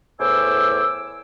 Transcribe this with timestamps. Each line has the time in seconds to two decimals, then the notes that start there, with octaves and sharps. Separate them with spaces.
0.19 E2 A2 C5 G#5 D6 E6